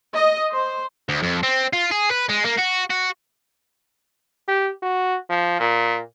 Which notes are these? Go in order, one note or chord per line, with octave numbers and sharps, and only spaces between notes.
D#5
C5
D2
F2
C4
F4
G#4
B4
G#3
A#3
F#4
F#4
G4
F#4
F3
A#2